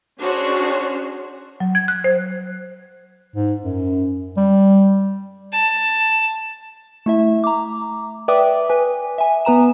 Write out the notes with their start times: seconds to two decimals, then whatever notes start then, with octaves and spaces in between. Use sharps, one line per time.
0.20 C#4 D4 F#4 G#4 C5 C#5
1.60 F#3
1.75 G#6
1.88 F#6
2.04 C5
3.36 G#2
3.62 F#2
4.37 G3
5.53 A5
7.06 A3 E4 E5
7.44 A#5 D6
8.28 B4 D5 E5 G5 D6 D#6
8.69 B4 G#5
9.18 E5 G#5
9.45 B3 B4 A#5 E7